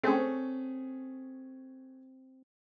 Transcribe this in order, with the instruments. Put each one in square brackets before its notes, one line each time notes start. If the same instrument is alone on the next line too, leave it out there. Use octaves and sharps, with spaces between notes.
[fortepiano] A3 C#4 G#4 [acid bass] C4